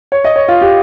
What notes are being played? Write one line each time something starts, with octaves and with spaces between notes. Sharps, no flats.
C#5
D#5
C#5
F4
G4